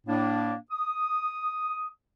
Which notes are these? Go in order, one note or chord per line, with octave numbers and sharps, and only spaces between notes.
A2 A#3 D4
D#6